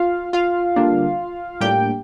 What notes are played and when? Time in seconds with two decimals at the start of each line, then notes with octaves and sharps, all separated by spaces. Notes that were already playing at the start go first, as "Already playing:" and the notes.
Already playing: F4 F5
0.33 F4 F5
0.76 D3 G3 A#3 D4
1.61 A2 G3 A#3 D4 G4 G5